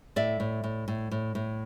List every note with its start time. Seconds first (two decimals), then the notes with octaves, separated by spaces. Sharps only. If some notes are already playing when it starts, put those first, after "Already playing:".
0.16 A2 D5 E5
0.40 A2
0.64 A2
0.88 A2
1.11 A2
1.35 A2